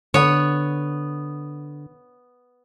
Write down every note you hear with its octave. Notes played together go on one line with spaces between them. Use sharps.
D3 B3 C#5